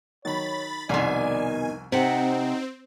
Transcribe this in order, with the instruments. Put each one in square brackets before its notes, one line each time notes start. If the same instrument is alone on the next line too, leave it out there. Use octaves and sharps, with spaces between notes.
[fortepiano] D#3 F#3 [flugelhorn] C#5 [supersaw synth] B5 A6
[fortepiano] C2 F2 C6 [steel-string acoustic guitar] B2 D#3 [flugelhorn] D5 [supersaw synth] G#5
[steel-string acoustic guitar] C3 F#5 [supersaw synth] C4 [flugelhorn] D#4 [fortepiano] C5